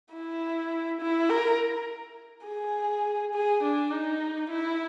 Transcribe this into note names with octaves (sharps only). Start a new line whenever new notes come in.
E4
E4
A#4
G#4
G#4
D4
D#4
E4